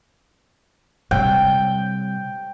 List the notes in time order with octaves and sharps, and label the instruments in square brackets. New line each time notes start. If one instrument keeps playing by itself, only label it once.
[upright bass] C3 G3 [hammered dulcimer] G5